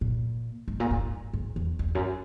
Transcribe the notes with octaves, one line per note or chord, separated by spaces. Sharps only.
A#2
G#2
A#2
G#2
G#2
E2
E2
F#2